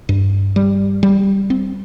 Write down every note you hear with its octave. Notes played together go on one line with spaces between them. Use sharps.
G2
G3
G3
C4